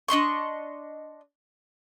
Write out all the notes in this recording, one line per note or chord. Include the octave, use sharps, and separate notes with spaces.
D4 D#5 C6 C#6